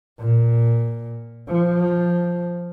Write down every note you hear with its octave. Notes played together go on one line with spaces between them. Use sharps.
A#2
F3